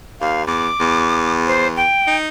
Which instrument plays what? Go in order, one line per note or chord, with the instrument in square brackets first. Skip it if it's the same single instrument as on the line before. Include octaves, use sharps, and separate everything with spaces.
[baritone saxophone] D#2 [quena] F5
[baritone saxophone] E2 [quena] D6
[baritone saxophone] E2
[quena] C5
G5
[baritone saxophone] D#4